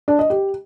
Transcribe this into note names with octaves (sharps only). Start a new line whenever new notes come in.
D4
D#5
G4